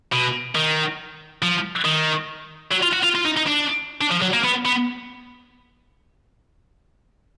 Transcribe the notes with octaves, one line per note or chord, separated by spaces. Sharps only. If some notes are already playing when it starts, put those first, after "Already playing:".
B2
D#3
F3
D#3
F#3
F4
F#4
F4
F4
D#4
D#4
D4
D4
F3
F#3
A#3
B3
B3